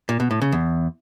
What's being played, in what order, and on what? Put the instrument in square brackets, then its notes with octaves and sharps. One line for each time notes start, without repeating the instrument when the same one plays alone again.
[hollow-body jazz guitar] A#2
B2
A2
C#3
E2